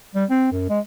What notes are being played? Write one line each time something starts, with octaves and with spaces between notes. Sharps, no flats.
G3
C4
F#2
G#3